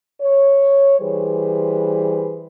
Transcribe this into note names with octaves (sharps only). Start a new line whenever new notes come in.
C#5
E3 G3 G#4 B4 C5